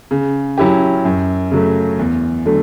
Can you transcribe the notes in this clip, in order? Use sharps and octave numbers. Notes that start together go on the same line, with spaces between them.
C#3
F#3 C#4 E4 G4
F#2
C#3 F#3 A3
E2
D3 F#3 A3